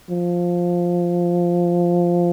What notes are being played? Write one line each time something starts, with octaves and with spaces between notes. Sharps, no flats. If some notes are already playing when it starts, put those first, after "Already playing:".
F3